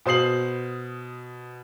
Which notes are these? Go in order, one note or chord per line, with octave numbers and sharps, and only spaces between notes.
B2 C5 D#6 C7 F#7